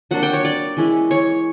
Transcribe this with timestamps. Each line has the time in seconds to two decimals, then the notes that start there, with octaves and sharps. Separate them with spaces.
0.11 F#3 A#3 D4 F#5
0.23 G5
0.33 C#5
0.45 D5
0.77 E3 G#3 C#4 E4
1.11 C#5